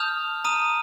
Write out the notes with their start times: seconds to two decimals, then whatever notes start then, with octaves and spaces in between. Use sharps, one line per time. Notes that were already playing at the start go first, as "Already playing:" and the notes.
Already playing: A5 D#6 F6 G6 F7
0.44 A#5 D#6 F6 D#7